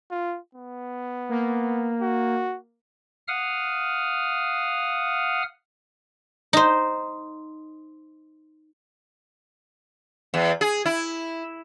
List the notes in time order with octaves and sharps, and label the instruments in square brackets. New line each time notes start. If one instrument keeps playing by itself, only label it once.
[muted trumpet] F4
B3
[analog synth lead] A#3
[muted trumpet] F#4
[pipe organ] F5 F#5 D#6 F6
[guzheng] D#4 C5
[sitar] E2
G#4
E4